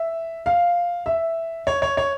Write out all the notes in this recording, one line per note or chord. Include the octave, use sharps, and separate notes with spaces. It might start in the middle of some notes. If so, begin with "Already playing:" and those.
Already playing: E5
F5
E5
C#5
C#5
C#5